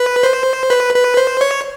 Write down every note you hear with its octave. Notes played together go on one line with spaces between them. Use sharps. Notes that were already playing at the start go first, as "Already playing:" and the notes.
Already playing: B4
C5
B4
B4
C5
C#5